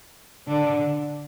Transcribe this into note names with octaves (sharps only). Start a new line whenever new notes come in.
D3 D4